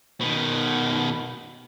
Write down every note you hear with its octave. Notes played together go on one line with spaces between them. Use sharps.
B2 D#3